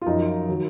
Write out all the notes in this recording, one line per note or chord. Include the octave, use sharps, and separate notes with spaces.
F4
F#2 F3 D#4
D#3 F#3